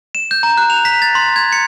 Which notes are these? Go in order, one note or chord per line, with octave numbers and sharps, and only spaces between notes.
E7
G6
A#5
F#6
F7
B6
A6
C6
G#6
C#7